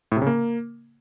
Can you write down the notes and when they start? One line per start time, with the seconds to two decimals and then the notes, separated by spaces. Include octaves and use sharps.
0.12 A2
0.17 C3
0.22 C#3
0.27 A#3